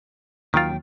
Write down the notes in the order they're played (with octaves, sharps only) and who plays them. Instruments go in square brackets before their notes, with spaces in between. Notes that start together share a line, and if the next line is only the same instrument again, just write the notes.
[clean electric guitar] D#2 F#3 G5 [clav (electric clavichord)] D#3 F4